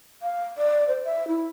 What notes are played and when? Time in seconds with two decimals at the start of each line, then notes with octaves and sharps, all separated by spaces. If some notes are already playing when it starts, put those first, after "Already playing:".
0.22 F5
0.58 D5
0.88 C5
1.05 E5
1.28 E4